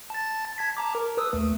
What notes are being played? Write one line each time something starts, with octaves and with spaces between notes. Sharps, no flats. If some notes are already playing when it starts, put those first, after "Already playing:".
A5 A6
A5 G#6 B6
A5 A#5 D6
A#4
B4 D#6 E6
D#2 A3